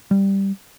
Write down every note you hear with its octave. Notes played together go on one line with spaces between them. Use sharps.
G3